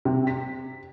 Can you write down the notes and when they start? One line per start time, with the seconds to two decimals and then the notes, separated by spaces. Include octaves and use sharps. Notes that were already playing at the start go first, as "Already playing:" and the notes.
0.05 C3
0.27 B6